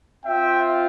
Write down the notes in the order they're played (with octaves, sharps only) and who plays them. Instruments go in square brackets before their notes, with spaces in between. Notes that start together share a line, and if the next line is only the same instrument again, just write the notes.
[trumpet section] C4 F4 E5 G5